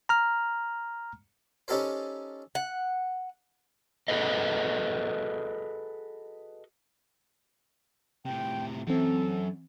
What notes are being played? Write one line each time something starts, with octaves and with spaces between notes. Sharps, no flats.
A#5 F6
C#4 D#4 G4 A4 A#4 C5
F#5
F#4 G#4 A4 B4 D#5
A2 C3 G5
F#2 E3 C4 A4